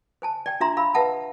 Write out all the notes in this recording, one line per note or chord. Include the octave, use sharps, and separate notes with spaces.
C5 G#5 A5
D5 G5
D4 F4 E5 A#5 C6
F5 B5 E6
B4 E5 F#5 A5